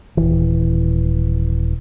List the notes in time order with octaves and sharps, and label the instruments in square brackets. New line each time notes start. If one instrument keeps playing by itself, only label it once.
[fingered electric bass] D#1 C2 E3